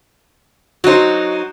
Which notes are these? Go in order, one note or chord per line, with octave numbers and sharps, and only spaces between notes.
F#3 D#4 F#4 C5